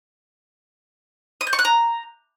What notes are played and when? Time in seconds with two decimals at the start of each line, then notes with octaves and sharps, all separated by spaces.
1.41 D#6
1.47 G6
1.53 C#6
1.59 F#6
1.65 A#5